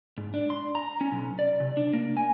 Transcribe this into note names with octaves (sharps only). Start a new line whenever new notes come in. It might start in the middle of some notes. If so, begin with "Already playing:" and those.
G#2
D4
C6
A#5
C#4
B1
D5
C3
D4
A#3
G#5